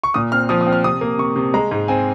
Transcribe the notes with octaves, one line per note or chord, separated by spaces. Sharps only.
C#6
A#2 D#6
C4 F6
F3 D#6
D#6
C4
F6
C3 D#6
A#3
C3 C#6
C3
G#3 A#5
G#2
C4 G#5